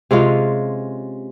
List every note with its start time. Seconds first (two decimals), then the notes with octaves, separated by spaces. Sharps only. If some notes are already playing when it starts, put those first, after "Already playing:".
0.11 C3 G#3 C#4 F4